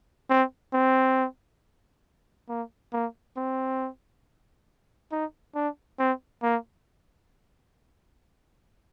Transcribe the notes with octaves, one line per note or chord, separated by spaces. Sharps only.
C4
C4
A#3
A#3
C4
D#4
D4
C4
A#3